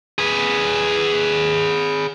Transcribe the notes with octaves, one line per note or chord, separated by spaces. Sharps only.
G#4 B4